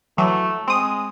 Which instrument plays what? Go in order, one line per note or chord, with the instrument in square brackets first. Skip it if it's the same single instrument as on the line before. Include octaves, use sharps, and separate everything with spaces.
[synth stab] E3 F#3 [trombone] A3
[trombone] G#3 [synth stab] C4 D#6